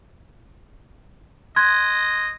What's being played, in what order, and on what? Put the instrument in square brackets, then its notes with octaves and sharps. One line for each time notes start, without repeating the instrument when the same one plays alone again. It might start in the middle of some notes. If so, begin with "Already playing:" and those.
[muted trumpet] D#5 [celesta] C6 F#6 G#6